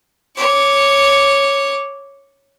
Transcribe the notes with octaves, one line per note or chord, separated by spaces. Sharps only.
C#5 D6